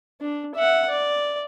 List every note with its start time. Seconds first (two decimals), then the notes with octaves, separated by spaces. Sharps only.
0.21 D4
0.55 E5 F#5
0.89 D5